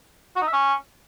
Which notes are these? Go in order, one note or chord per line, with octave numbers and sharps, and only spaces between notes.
F#4
D#4
E5
C#4